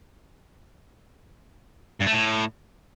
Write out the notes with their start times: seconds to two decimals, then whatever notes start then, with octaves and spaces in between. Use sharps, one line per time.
2.00 G2
2.06 A3
2.12 A2